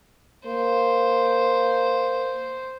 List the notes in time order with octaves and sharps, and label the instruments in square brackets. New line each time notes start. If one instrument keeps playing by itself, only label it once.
[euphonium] A#3 [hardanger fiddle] C5